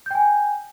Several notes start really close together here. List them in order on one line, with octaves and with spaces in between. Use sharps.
G6 G5 G#5